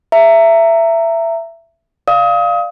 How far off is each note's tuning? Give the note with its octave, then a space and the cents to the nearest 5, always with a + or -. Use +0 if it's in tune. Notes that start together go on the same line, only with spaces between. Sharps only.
E5 +15 A#5 -20
D5 +20 F5 +0 D#6 +30